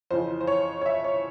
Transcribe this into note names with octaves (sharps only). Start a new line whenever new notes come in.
F2 C#3 E3 C5
C5
C#5
C#5
E5
C#5